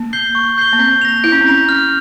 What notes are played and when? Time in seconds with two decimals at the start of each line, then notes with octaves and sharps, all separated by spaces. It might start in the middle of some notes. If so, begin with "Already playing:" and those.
Already playing: A#3
0.13 G6 C7 G7
0.35 C#6
0.58 G6 C7 G7
0.73 A#3
0.79 C4 G6
1.02 A#6 F7
1.24 E4 G6
1.32 C#4
1.41 C4
1.47 C#4 A#6 F7
1.69 F6